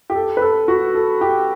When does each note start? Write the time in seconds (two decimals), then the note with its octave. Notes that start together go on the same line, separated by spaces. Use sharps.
0.10 G4
0.15 A4
0.37 B4
0.41 A4
0.68 F#4
0.95 A4
1.21 G4